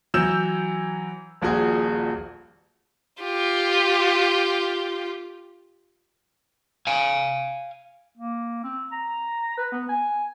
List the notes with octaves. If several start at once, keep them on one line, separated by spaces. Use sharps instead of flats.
E3 F#3 E6 G6 E7
D#1 A#1 F#4 G#4
F4 G4
F5 G#5
A#3
C4
A#5
B4
B3
G#5